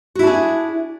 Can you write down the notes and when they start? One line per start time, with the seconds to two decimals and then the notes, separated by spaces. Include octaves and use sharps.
0.15 F#4
0.19 E4
0.23 D4
0.27 G#4